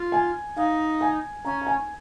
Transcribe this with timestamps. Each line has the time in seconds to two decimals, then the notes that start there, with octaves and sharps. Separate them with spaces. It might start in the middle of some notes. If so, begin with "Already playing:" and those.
Already playing: F4
0.12 G#5
0.56 D#4 F5
1.01 G#5
1.45 C#4 A#5
1.62 A#5
1.67 G#5